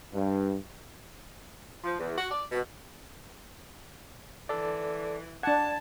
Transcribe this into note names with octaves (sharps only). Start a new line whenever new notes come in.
G2
F3
E2
F#4
D5
B2
E3 A4 D5
D4 F#5 A5 G#6